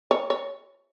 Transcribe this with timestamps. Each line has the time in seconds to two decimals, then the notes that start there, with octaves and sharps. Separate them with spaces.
0.11 C#5
0.30 C#5